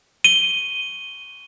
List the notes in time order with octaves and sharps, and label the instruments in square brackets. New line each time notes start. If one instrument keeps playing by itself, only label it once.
[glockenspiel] D#7 G7